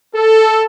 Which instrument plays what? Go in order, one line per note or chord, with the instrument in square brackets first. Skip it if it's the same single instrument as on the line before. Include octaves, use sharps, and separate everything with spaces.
[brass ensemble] A4